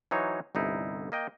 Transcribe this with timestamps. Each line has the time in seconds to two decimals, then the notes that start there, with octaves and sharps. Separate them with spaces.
0.11 E3 F#3 D#4 C5 C#5
0.55 G1 C2 D#4 E4
1.12 A#3 D#5 G5